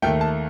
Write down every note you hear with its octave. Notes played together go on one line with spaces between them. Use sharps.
D#2 D#3 A3 G5
A5